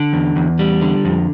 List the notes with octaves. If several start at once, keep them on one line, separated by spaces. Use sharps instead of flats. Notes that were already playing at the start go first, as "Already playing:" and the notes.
Already playing: D3
E2
E2
G3
D3
F2